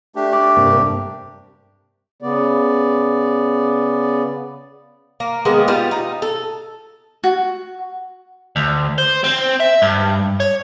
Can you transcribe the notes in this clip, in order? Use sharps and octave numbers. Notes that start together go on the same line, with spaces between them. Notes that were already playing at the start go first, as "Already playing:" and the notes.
A3 D4 G4
D5
G2 C3 A#3
C#3 B3 D5
A#3
D#3 G#3 A#3 B3
G3 B3 F4
D#4
A4
F#4
D2
C5
C4
E5
G2
C#5